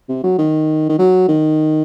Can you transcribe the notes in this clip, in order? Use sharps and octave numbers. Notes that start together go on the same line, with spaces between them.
C3
F#3
D#3
D#3
F#3
D#3